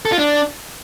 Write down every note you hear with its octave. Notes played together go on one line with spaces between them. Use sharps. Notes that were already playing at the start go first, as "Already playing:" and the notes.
A4
F4
D4